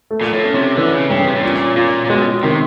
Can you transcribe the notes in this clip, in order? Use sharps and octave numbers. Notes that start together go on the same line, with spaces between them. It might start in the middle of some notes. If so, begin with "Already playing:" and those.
A3
A#2
A2
C#4
C3
D3 E3
C#3
G2 C#3
C3
A2
A#2 C#4
A#2 F4
A#2
B2 G#3
C3 D#3